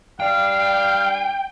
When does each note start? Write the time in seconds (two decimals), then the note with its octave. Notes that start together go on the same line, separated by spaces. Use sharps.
0.20 G3 D4 F5 G5